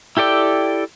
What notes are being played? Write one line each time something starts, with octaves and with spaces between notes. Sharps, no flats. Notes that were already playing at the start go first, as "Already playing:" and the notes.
E4 G4 A4 D5 G5